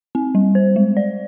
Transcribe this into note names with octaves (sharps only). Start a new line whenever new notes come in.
C4
G3
C5
G#3
D5